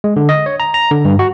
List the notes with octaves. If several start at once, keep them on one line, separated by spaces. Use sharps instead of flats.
G#3
D3
D#5
C#5
A#5
A#5
D3
G2
F#4